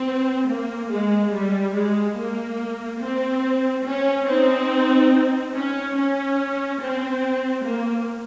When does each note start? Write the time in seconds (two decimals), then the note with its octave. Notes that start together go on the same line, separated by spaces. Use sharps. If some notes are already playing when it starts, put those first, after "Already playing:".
Already playing: C4
0.48 A#3
0.91 G#3
1.33 G3
1.74 G#3
2.17 A#3
3.01 C4
3.85 C#4
4.27 C4 D#4
5.54 C#4
5.96 C#4
6.80 C4
7.63 A#3